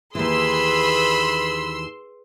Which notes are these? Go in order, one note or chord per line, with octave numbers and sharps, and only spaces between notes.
D#2 E3 G#4 B4 B5 C6 E6